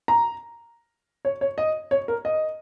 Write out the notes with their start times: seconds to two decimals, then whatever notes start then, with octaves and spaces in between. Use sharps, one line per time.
0.08 A#5
1.25 C#5
1.41 C#5
1.58 D#5
1.91 C#5
2.08 A#4
2.25 D#5